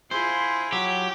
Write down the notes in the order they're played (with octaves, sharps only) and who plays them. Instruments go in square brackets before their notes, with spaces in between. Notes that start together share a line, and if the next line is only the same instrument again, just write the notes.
[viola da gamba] E4 F4 G#4 [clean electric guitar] C5
[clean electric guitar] F#3 [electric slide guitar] G4